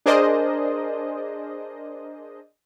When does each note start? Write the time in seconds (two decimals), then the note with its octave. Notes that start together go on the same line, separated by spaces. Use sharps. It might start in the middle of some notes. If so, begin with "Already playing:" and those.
0.06 D4 G#4 A#4 C5 D5 D#5